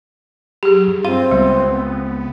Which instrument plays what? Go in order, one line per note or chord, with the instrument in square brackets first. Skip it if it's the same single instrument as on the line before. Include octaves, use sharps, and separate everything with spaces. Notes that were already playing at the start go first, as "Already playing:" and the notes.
[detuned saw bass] F#3 [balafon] G4 G#4
[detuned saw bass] G2
[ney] C4 [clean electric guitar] F4 [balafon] F5
[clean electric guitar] C#2 [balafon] G3 [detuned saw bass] B3